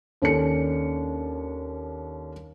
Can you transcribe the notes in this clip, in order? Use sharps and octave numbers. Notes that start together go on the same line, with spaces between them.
D#2 C#4 D4 A4 C#7